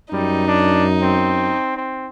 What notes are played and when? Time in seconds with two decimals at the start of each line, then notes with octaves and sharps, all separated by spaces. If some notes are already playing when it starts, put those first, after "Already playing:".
0.12 F#2 G3 D#4
0.48 D4
1.03 C4
1.77 C4